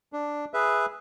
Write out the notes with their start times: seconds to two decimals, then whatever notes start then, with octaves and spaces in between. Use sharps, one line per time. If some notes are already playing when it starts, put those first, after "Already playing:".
0.13 D4
0.53 G#4 B4 E5